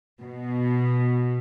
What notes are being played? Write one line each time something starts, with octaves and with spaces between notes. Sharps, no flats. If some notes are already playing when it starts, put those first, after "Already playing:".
B2